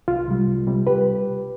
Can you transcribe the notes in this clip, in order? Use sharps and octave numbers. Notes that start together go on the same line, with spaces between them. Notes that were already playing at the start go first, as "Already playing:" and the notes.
C2 F4
C3 G3
C2
C3 G3
G4 B4